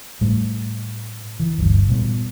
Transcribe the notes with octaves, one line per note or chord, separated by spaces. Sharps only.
A2 G3 A3
E3
G1 D2 G2
A#2 G3 B3